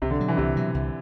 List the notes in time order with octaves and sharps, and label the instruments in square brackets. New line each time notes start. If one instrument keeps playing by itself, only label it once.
[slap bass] C2 [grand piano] C3
[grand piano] D3
[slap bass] B2 F#3
[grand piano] E3
[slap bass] C2 [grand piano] C3
[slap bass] B2 F#3
C2